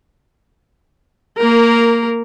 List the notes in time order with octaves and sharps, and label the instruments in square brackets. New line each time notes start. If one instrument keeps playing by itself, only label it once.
[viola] A#3 A#4